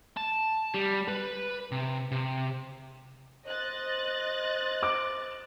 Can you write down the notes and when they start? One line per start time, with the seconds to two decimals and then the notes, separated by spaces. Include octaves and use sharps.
0.17 A5
0.74 G3
1.08 B4
1.71 C3
2.11 C3
3.46 C5 D#5 F#6 A6
4.83 D6